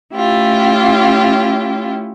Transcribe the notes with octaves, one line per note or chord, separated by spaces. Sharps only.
A3 C#4 E4 F4 G4